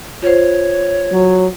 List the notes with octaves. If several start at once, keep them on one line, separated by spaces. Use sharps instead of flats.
F4 C5 C#5
F#3